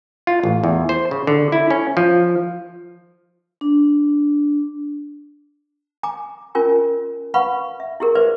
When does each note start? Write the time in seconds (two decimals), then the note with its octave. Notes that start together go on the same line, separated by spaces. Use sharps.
0.27 F4
0.43 A1
0.63 E2
0.89 C5
1.11 C#3
1.27 D3
1.52 E4
1.70 C#4
1.97 F3
3.61 D4
6.03 G#5 A#5 D6
6.55 C#4 F4 A#4 G#5 C6
7.34 B4 F5 F#5 B5 C#6
7.80 E5
8.00 E4 G4 G#4 A#4
8.15 B4 C5 D5 E5 C6